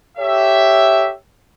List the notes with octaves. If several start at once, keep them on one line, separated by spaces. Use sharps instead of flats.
G4 A4 C#5 E5